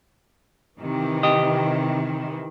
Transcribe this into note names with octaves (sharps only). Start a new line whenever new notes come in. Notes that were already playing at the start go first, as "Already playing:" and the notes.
C3 D#3 E3
G4 D#5